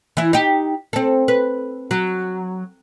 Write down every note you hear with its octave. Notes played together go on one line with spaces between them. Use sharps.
E3 E4
D#4 G4
C4 A4
B4
F#3